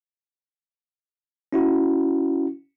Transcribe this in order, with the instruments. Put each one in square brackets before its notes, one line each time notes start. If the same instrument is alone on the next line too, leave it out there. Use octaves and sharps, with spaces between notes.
[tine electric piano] C#4 E4 F#4